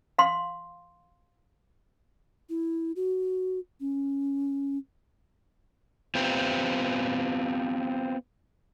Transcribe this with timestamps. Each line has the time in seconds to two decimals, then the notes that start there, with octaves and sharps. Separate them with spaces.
0.19 F5 C6
2.50 E4
2.96 F#4
3.80 C#4
6.15 B3 C4 F4 G4